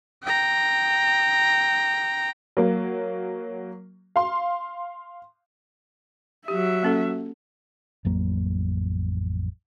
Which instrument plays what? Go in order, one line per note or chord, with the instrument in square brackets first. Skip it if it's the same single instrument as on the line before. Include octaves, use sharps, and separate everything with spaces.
[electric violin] G5 A#5
[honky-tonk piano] F#3 A#3
F5 C6
[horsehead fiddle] F#3 E5 [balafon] G4
[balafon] A#3 C#4 A4
[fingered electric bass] A1 F2 F#3 A#3